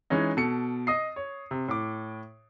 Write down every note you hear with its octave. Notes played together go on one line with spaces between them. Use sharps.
E3 G#3 C#4 D#4
B2 A4 C#7
D#5 D#6 C7
C#5
C3
A2 D6